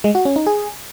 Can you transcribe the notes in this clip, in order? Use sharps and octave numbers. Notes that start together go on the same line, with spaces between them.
G#3
F#4
C#4
D#4
G#4